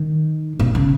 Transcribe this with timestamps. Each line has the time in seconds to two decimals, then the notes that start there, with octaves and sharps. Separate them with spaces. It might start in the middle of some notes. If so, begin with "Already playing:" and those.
Already playing: D#3
0.60 B2
0.75 C#3